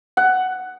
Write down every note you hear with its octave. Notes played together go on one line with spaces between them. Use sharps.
F#5